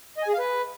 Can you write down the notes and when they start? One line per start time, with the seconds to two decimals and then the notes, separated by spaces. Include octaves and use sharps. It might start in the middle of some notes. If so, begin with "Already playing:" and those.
0.17 D#5
0.23 G#5
0.28 G#4
0.33 F5
0.39 B4